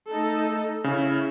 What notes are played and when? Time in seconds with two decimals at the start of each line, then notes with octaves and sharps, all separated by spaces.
0.10 A3 D#4 A4
0.84 C#3 C#4 E4